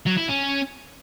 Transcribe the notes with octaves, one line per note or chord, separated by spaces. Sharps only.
F#3
E4
C#4